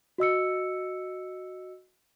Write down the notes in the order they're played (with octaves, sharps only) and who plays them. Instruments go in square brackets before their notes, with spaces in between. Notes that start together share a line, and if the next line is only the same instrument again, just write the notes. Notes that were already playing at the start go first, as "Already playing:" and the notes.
[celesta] F#4 D#5 E6 C#7